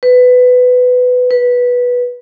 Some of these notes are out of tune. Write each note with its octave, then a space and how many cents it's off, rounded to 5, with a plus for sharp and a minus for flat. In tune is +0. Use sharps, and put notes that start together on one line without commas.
B4 +15
B4 -10